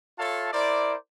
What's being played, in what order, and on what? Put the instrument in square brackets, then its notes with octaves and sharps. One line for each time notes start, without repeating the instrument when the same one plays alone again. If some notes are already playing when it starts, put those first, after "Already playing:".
[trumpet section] F4 A4 C#5 E5 F5 A5
E4 A#4 C5 D5